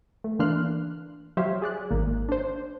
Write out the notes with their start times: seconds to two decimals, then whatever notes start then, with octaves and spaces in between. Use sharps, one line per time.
0.24 A3
0.39 E3 A#3 D4 C6 F6 F#6
1.37 F#3 G4 C5 C#5 E5 F5
1.62 G#4 D5 F#6
1.91 G#1 A#3
2.29 D4 C5